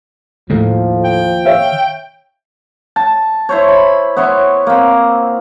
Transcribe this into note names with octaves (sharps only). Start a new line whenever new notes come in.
A2 D#3 F3 A#3
G5
C#5 E5 F5
A5
E4 C5 C#5
B5
B3 C#5 E5 C6
A#3 C4